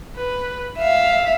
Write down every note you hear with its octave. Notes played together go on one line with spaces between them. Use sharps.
B4
E5 F5